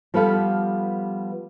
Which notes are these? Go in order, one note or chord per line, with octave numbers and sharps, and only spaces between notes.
F3 G3 B3 A4 B4 F5